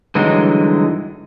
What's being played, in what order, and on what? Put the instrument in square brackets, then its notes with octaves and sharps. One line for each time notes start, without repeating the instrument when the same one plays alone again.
[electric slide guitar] G2 D3 E3 F#3 G#3 D#4